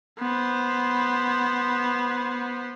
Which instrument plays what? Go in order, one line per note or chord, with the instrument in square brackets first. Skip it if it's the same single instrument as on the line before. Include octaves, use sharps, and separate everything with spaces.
[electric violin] B3 C5